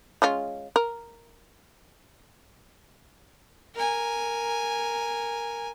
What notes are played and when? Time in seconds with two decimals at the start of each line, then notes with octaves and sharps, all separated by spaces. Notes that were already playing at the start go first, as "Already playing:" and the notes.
0.22 G#3 C#4 F4
0.76 A#4
3.75 A#4 G#5